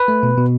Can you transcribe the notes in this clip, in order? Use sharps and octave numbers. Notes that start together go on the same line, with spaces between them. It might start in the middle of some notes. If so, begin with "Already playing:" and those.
Already playing: B4
A3
B2
B2